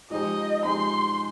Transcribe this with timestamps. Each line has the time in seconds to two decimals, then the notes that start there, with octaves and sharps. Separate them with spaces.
0.10 F3 G#3 D#4 G4 C5 D#5
0.65 F3 G#3 D#4 G4 C5 C6